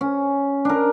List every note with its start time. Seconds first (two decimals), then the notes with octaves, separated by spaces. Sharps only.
0.01 C#4
0.65 D4 A#4